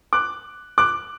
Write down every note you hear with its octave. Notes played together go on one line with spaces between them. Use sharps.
D6 F#6
D6 F#6